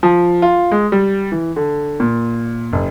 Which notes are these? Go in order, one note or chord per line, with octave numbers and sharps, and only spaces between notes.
F3
F4
G#3
G3
E3
D3
A#2
F#1